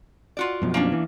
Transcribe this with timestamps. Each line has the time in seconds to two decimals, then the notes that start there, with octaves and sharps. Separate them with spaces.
0.37 F4 F#4 D5
0.62 F#2 B2 F3
0.74 A#3 C#4 D4
0.92 E3